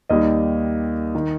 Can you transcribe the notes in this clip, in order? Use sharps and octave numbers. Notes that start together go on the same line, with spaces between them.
D#2 D#3 G3 D#5
D#3